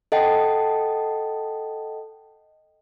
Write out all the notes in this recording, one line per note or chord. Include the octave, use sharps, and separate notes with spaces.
A4 D#5 F#5 G5 A5